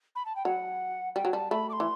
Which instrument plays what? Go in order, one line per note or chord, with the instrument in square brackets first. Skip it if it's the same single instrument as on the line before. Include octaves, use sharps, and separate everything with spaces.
[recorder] B5
A5
G5
[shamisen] F#3 [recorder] F#5
[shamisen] G3 [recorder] G5
[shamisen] F#3
[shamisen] G3 [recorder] A5
[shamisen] A3 [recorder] B5
[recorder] D6
C6
[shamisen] E3